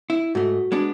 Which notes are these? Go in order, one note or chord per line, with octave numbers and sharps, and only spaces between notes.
E4
G#2 A3 F#4
G#3 B3 D4